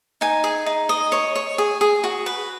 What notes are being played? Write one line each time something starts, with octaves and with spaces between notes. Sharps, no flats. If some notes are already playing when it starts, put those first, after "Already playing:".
D#4 G#5
G#4
D#4
D#5
C#5
C#5
G#4
G#4
F#4
B4